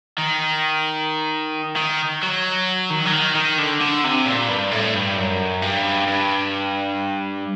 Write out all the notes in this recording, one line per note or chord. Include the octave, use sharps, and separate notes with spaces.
D#3
D#3
F#3
D#3
F#3
D#3
D#3
D3
D3
C3
A#2
G2
A2
G2
F#2
G2
G2